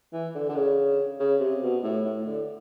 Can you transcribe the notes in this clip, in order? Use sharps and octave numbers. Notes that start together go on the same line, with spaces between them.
E3
D3
D3
C#3
C#3
C3
B2
A2
A2
D3